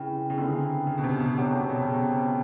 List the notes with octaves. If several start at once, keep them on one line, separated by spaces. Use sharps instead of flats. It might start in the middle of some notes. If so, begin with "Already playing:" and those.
Already playing: C#3 C4 E4 G4 B4
C#3
D3 C4 D#4 G#4 B4
C#3
B2
C3
B2
F#3 A3 D4 G4
B2
C3
B2
C3
C#3